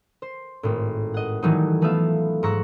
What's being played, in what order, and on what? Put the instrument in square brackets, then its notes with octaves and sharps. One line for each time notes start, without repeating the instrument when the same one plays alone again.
[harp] C5
G#1 A2
D#5 F#5
D#3 E3 F#3 G3 A3 D#4
F3 A3 B3 B4 E5 F5
G#2 A#5 C#6 E6 F#6